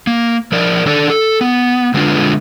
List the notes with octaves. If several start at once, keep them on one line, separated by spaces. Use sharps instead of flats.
A#3
F3 A#4 D5
D#3 D4 A4 D5
A4
B3
D3 G#3 B3 D4 F4 B4